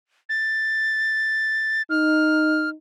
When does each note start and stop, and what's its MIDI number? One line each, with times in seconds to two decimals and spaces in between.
0.29 1.82 93
1.90 2.74 63
1.90 2.70 89